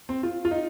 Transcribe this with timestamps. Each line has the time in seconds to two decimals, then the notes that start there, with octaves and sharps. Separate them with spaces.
0.09 C4
0.23 F4
0.45 F4
0.51 D#4